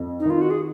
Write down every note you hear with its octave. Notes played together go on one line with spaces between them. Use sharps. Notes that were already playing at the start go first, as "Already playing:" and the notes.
Already playing: F2
D#4
D#3 F4
F#4
G#4